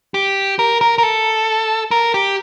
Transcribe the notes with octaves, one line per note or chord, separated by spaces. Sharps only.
G4
A#4
A#4
A#4
A4
A#4
G4